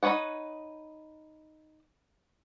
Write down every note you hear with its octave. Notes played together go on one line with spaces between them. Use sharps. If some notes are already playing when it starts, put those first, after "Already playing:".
D#4 F4 B4 C#5 F#5